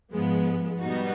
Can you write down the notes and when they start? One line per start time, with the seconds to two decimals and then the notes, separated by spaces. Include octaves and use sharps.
0.11 G#2 F3 G#3 B3
0.80 B2 G3 B3 D#4 F#4